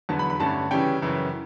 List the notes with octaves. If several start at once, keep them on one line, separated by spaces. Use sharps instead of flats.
E2 D3 F#3 B3 A5
B5
B5
G2 D3 A3 C#4 A5
C#3 E3 G3 C#4 G5
F#2 C#3 E3